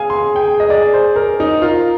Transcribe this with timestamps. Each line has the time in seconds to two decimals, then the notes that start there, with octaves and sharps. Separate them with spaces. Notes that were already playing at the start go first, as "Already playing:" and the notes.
Already playing: G#4 F5 G#5
0.10 C6
0.36 G5
0.60 D#5
0.70 D5
0.94 C5
1.16 A#4
1.40 D#4
1.62 F4 A#4